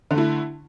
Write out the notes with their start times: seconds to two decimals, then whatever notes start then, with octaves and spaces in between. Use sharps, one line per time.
0.11 D3
0.14 A3
0.18 E4